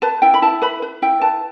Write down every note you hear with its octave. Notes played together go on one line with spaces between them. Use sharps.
B4 A5
E4 G5
B5
E4 A5
B4 B5
B4
E4 G5
B4 A5